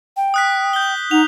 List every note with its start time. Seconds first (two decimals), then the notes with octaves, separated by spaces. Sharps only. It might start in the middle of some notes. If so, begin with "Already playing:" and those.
0.17 G5
0.34 D#6 F#6 B6
0.73 G6 G7
1.11 D#4 F#5 F7